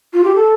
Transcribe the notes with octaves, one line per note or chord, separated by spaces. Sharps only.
F4
G4
A4